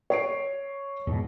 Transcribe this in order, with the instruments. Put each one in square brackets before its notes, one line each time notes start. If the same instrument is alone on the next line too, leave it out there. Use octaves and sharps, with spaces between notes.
[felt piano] C#5 C7 D7
[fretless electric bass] E2 G#2 B2